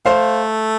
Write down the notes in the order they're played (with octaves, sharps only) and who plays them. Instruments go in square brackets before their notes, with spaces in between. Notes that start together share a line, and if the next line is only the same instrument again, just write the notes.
[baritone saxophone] A3 [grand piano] C5 F5